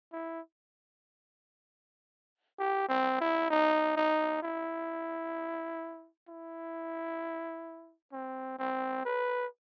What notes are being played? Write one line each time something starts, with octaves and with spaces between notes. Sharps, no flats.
E4
G4
C4
E4
D#4
D#4
E4
E4
C4
C4
B4